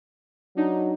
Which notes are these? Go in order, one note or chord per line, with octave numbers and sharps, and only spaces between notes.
F#3 D4 D#4